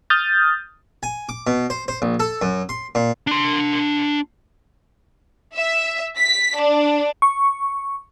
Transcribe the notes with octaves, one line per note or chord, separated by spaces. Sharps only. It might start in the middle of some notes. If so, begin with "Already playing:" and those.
D#6 F6 G6 A6
G#5
D6
B2
C5
C5
A#1
A4
F#2
C6
A#2
D4 C6
E5
B6
D4
C#6